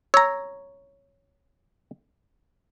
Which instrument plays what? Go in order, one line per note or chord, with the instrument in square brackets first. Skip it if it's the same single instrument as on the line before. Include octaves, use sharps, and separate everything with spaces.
[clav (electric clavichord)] C#5 A#5 [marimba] E6